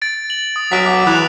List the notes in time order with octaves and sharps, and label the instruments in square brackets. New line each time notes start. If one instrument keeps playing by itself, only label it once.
[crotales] A6 D7
F#7
D#6
[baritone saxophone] F#3 [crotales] B6 D7
[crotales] D6
[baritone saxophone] E3 [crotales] D#6 F#6 F7